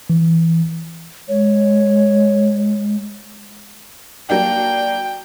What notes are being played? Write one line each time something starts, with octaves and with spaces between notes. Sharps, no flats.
E3
G#3 C#5
F#3 A#3 D4 G5